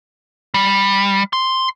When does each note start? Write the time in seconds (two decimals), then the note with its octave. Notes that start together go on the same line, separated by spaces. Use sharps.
0.54 G3
1.33 C6